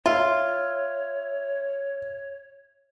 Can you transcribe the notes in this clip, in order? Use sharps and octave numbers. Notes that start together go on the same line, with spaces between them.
F4 C#5 E5